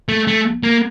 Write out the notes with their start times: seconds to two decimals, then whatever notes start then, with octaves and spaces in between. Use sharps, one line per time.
0.09 A3
0.27 A3
0.63 A#3